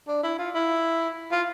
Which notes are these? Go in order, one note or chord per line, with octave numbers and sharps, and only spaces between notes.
D4
E4
F4
E4
F4